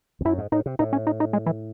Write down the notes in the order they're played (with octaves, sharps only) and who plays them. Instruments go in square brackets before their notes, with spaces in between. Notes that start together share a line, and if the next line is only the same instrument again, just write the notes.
[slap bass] E2
[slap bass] F#2 [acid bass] E4
[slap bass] G#2
[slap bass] A2 [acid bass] D#4
[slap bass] C3
[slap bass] A2 [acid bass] D#4
[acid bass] C#4
D#4
D#4
G#3
E3